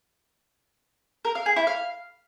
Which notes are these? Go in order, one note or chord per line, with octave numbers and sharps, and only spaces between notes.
A#4
F5
G#4
E4
F5